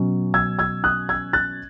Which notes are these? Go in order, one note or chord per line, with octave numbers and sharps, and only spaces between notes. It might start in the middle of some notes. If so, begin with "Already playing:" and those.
Already playing: B2 F#3 C#4
E6 G#6
E6 G#6
D#6 F#6
E6 G#6
F#6 A6